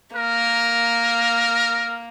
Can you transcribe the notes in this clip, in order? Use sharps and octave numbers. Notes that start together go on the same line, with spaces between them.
A#3 A#4